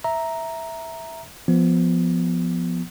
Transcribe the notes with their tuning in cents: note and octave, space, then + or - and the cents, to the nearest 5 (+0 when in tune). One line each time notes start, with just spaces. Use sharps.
E5 -5 A#5 +0
F3 +0 B3 +0